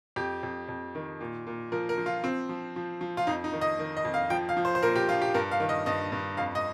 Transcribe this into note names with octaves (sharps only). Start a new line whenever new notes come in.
F2 G4
F2
F2
D#3
A#2
A#2
F3 A#4
A#4
F3
F4
F3 C4
F3
F3
F3
F4
F2 D#4
D#4
D#3
D#5
D#3
D#5
F2
F5
F3 G5
F5
F3
C5
C5
A#2 A#4
G4
F3 F4
G4
G2 A#4
F5
D#3
D#5
G2 D#5
G2
F2 F5
D#5